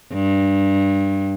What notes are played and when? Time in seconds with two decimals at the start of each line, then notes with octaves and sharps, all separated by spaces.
0.13 G2